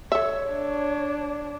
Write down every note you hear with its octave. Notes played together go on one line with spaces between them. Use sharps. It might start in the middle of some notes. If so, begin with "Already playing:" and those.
A4 C#5 E5
D4